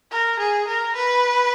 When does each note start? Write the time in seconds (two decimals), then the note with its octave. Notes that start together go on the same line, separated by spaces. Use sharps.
0.11 A#4
0.39 G#4
0.68 A#4
0.96 B4